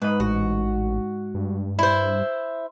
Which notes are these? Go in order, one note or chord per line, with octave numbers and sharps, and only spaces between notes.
G#2 B4 D#5
A1 F#4
G2
E4 C5